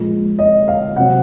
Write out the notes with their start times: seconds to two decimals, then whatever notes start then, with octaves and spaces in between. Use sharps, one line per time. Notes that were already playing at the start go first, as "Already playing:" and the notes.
Already playing: A#2 F3 G#3
0.39 D#5
0.68 F5
0.96 C3 F#3 C4 F#5